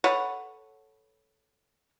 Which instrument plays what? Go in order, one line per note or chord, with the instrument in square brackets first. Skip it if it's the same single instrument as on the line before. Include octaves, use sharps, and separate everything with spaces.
[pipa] A4 B4 C#5 F#5